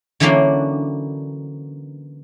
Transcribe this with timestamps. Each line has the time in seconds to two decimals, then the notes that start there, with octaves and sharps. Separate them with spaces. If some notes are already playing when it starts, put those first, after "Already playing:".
0.20 D3 E3 F#3 A#3 C#4 D4